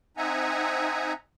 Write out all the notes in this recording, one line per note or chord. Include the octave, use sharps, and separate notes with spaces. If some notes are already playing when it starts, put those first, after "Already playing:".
C4 D#4 E5 F#5 G#5 A#5